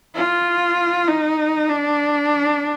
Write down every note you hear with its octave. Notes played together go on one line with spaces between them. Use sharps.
F4
D#4
D4